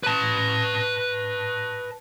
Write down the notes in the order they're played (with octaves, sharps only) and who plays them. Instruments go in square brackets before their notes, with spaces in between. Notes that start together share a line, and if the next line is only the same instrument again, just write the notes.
[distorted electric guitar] B4 A5